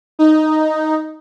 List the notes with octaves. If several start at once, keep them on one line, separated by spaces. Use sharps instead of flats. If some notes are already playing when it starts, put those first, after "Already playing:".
D#4